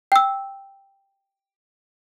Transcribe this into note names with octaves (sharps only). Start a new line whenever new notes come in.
G5 E6